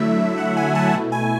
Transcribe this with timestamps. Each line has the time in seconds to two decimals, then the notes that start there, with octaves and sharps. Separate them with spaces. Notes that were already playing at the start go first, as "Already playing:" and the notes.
Already playing: D3 F#3 A3 E4 E5
0.38 F#5
0.57 G#5
0.75 A5
0.93 B2 A3 E4
1.12 G#5